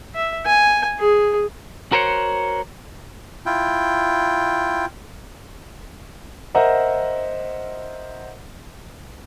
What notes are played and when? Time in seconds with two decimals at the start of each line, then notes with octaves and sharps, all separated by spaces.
0.15 E5
0.46 G#5
0.99 G#4
1.92 F#4 A#4 C5 C#5 F#5
3.46 E4 F4 G5
6.55 A#4 C5 D#5 E5 F#5 A#5